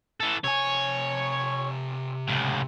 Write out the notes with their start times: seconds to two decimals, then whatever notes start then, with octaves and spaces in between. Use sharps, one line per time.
0.20 E3 A4
0.44 C3 C#5 G#5
2.28 C#2 A2